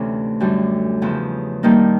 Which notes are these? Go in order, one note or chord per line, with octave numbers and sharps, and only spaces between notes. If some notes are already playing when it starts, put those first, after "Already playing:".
Already playing: D2 C3 E3 A3 C#4
F#2 D3 G3
E2 C#3 F3
G2 D#3 G3 A#3 D#4